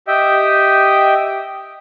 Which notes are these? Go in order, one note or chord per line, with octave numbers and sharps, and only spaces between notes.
G4 D#5 E5 G5